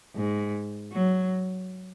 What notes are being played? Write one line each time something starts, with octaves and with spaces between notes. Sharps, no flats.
G#2
F#3